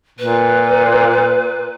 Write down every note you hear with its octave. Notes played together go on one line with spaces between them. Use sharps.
A#2 B4